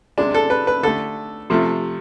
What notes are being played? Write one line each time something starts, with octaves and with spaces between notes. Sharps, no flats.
C3 G#3 D4
A4
B4
B4
D3 A3 A4
C3 F3 A3